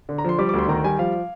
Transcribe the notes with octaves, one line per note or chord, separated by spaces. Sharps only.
D3
A#5
F3 C6
G3 D6
D6
D2 C6
D#3 A#5
G3 G#5
F3 F5